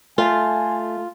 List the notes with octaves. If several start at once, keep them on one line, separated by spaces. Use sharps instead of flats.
A3 F4 G#5